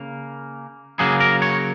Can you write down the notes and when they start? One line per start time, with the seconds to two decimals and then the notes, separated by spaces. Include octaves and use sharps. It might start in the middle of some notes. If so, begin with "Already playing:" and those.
Already playing: C#3 A#3
0.99 C#3 F#3 A#3 G#4
1.20 A#4
1.42 C#5